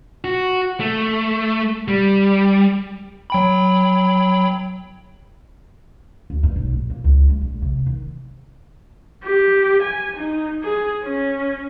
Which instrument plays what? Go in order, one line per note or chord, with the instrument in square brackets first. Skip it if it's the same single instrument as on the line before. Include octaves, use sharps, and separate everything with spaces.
[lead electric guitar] F#4
A3
G3
[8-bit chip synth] F#3 G5 B5
[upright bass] D2
G2
B1
A#1
A#3
C#2
G#3
A#1
C3
D#3
[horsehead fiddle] G4
G#5
D#4
G#4
C#4